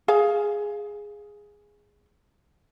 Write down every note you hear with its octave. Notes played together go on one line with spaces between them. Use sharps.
G#4 F5